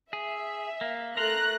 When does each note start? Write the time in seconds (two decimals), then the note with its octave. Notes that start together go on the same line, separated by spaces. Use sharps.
0.13 G#4 E5
0.81 A#3
1.17 A3 A#4 A#5 C6 F#6 A#6